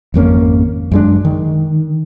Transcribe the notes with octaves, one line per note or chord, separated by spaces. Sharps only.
G#1 F2 A#3 C#4
F#2 G#3 D4
D#3